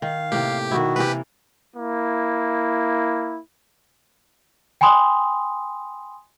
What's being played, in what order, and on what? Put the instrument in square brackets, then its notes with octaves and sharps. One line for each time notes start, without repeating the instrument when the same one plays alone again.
[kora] D#3 [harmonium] F5
[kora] A2 C3 A#3 [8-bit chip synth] G4
[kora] B2 E4 [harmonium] D#3 F#4
[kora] C3 E3 A#3 [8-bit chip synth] G4 B4
[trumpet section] A#3 E4
[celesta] G5 G#5 B5 C6 D#6